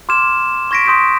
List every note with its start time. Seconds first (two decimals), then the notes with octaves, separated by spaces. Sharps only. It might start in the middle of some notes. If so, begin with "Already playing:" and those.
0.09 C6 D6 F6 G#6 E7
0.71 C#6 G#6 A#6 B6 D7
0.86 C6 D#6 G6 B6 D7